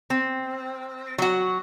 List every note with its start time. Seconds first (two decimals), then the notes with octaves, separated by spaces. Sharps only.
0.10 C4
1.18 F#3 F#4